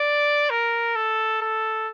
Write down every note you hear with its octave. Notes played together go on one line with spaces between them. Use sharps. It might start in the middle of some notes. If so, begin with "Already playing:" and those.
Already playing: D5
A#4
A4
A4